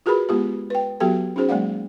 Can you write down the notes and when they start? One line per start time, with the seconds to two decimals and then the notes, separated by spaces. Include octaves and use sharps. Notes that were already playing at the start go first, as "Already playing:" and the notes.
0.06 F4 F#4 G#4 A#4 B4 B5
0.29 G#3 B3 F4 G4
0.70 B4 G5
1.00 F#3 B3 F#4 G4 A4 G5
1.36 C#4 D#4 F#4 G#4 C5
1.49 F#3 G#3 A#3 D5 F5 F#5